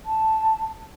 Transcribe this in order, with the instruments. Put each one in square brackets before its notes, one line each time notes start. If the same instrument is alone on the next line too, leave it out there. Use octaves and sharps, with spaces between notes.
[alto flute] A5